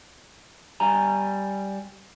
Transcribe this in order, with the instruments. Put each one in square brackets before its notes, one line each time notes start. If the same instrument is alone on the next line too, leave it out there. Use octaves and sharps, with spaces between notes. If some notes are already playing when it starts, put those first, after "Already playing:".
[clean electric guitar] G3 G#5 A#5